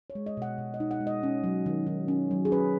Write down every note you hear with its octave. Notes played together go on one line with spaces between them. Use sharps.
C#5
G#3
D#5
B2 F#5
B2
D#5
D#4
F#5
G#3
D#5
C#4
F#3
D#3
D#3
C#4
F#3
G#4
C#4 B4